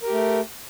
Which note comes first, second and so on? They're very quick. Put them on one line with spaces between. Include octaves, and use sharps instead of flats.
A#4 G4 A3